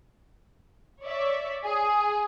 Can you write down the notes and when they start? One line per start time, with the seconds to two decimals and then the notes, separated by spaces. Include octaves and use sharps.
1.02 C#5 D5 E5
1.64 G#4